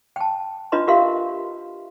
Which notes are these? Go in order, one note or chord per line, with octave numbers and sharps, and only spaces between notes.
G5 A5
D4 F4 B4 D#5 A#5 C6
F4 G4 A#4 E5 F5 C6